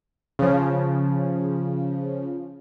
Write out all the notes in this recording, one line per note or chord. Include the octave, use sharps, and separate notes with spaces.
C#3 F3